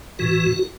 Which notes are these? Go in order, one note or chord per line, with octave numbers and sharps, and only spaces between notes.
A2 E3 F#4